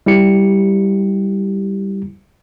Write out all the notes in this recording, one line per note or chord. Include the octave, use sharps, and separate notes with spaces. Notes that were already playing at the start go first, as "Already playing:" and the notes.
G3 E4 G4 C#7